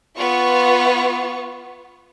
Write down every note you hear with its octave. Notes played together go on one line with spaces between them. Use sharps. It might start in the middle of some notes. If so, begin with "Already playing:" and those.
B3 F4 C#6